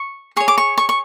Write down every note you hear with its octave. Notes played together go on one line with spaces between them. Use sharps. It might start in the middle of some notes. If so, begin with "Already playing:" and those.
Already playing: C#6
G#4 C#5 C#6
D6
C#6
C#6
C#6